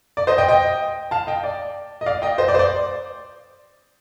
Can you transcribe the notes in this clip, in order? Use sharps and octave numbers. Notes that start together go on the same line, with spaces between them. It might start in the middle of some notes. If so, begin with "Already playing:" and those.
D5
C5 D#5
D#5 G5
D#5 G5
F5 A5
D#5 G5
D5
D#5
D5 F5
D#5 G5
C5 D#5
D5
C5
D5